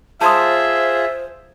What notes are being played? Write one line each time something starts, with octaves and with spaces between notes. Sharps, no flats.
F4 G#4 C5 E5 A5 C6 D#6